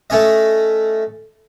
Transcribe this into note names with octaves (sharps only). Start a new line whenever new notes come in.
A3 C#4 D#5